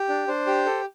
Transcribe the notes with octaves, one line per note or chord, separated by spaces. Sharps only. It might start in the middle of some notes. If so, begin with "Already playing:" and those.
Already playing: G4
D4
D4 C5
G4
A4